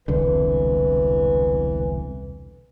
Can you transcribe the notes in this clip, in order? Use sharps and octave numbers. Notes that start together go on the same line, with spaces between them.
E1 C2 D3 E3